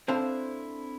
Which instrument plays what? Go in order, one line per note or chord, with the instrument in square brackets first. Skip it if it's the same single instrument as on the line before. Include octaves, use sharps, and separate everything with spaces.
[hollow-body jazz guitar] C4 D4 E4 A4 C5 F5